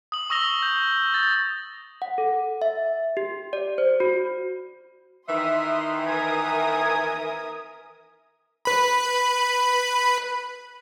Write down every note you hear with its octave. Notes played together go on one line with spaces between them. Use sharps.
D#6 F#7
C#6 D#6 E6 A#6 F7 G7
G6
A6
F#5
A4
E5
G4
D5
C5
F#4
D#3 E3 E5 C6 D#6
A#4 E5 G#5 D#6
B4 B5